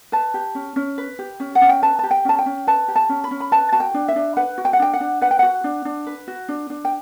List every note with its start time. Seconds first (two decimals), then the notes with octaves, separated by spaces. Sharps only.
0.12 B4 A5
0.34 G4
0.55 C#4
0.76 C#4
0.98 B4
1.19 G4
1.40 C#4
1.55 F#5
1.61 C#4
1.69 G5
1.82 B4 A5
1.99 G4 A5
2.11 G5
2.25 C#4 A5
2.39 G5
2.46 C#4
2.67 B4 A5
2.88 G4
2.96 A5
3.09 C#4
3.24 B5
3.31 C#4
3.40 B5
3.52 B4 A5
3.72 F#4 A5
3.80 G5
3.94 D4
4.08 E5
4.16 D4
4.37 B4 F#5
4.58 F#4
4.65 G5
4.73 F#5
4.80 D4 G5
4.94 F#5
5.00 D4
5.21 B4 F#5
5.31 G5
5.39 F#4 F#5
5.64 D4
5.85 D4
6.07 B4
6.28 F#4
6.49 D4
6.70 D4
6.85 G5